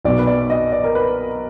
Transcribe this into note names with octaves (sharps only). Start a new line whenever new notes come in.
B1 B2 D5
B4
D5
D#5
D5
A#4
B4